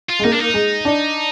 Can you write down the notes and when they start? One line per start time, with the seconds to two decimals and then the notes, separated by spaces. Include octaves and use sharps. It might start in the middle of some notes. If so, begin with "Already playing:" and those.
0.10 F4
0.19 G#3
0.24 A#3 D#4
0.32 D4
0.41 D#4
0.54 G#3
0.85 D4